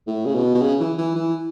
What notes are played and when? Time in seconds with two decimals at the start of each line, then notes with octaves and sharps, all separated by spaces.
0.07 A2
0.26 C#3
0.35 B2
0.55 B2
0.62 C#3
0.80 E3
0.99 E3
1.16 E3